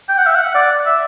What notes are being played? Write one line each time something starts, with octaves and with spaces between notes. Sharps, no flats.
G5
F#5
E5
F#5
D5
E5